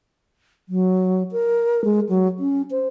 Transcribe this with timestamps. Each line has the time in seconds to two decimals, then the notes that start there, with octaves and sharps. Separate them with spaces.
0.69 F#3
1.32 A#4
1.85 G#3
2.09 F#3
2.39 C#4
2.71 C5